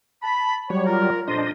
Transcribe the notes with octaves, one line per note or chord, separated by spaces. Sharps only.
A5 B5
F#3 G3 C#5
F4 A#4
F2 A#2 D4 C5 D#5